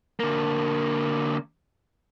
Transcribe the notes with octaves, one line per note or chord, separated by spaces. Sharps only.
D3 A#3